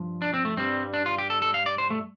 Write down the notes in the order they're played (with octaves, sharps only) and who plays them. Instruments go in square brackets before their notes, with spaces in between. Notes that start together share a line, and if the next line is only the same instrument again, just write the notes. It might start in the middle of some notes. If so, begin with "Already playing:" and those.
Already playing: [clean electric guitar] G2 F3
D4
C4
A3
G2 G3 C4
D4
F4
G4
A4
A4
F5
D5
C5
A3